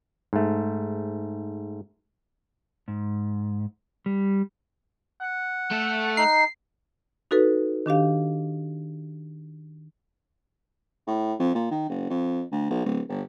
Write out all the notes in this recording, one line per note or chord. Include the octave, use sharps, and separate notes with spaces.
G#2 A3
G#2
G3
F#5
A3 A4
D#4 C7
D#4 F#4 A4 B4
D#3 D4 G4 F5
A2
F2
A#2
D#3
F#1
F2
D2
B1
D1
G1